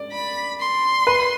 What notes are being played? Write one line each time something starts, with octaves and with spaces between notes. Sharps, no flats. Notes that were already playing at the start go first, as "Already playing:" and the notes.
Already playing: D5
B5
C6
B4